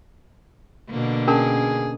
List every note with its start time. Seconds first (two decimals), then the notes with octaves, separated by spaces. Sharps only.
0.91 B2 D3 A#3
1.28 C#4 G#4 A#4 A5